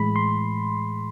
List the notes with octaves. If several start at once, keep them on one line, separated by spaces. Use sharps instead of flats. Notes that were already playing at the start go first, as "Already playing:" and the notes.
Already playing: A2 E3 G#3 B5
C6